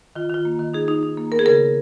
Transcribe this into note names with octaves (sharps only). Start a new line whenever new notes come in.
D#3 F4
D#3 F4
A#3
D#3
D#4 G#4
D#4
D#4
A#3
B3 A#4
G#4
C#3 A#4